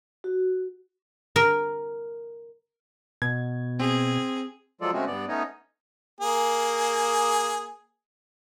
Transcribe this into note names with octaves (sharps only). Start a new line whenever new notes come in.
F#4
A#4
B2 G#6
C4 G#4
F3 F#3 G#3 F4 A4 D5
C#3 G#3 A3 C4 C#4 F#4
G2 B3 D5
A3 B3 C#4 D#4 C#5 D#5
A#3 G#4